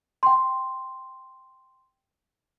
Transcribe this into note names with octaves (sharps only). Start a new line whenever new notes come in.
G5 C6